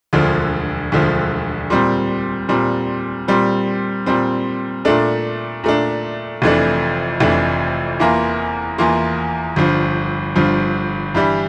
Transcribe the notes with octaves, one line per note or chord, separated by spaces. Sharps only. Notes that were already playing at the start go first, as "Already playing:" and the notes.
E1 D2 D3 F3
E1 D2 D3 F3
A#2 G3 C4
A#2 G3 C4
A#2 G3 C4
A#2 G3 C4
A#2 A3 D4
A#2 A3 D4
F1 F2 E3 A3 D4
F1 F2 E3 A3 D4
E2 E3 A#3 F4
E2 E3 A#3 F4
G1 G2 F3
G1 G2 F3
G2 E3 G3